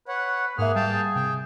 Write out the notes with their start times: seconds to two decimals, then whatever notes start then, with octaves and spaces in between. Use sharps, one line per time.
0.08 B4 C#5 F#5
0.58 G#2 A#3 G#4 E5 F#5 F6
0.76 G3 F5 G5 A5
0.92 G#4
1.16 C3 G5